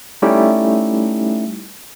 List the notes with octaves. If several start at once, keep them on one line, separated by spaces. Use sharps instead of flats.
G3 A3 C#4 D#4 E4 G4